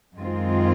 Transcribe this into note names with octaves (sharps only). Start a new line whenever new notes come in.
F#2 D#3 G#3 C4 F4